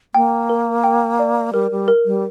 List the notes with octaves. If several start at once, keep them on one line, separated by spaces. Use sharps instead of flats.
A#3 G5
A#4
G5
D5
G3 A#4
G3
A#4
G3